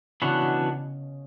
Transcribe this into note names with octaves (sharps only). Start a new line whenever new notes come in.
C#3 E3 B3 D4 F#4 B4
B2